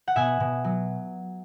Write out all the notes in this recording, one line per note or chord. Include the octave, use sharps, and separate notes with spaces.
F#5
B2 E5 G#5
B2
F#3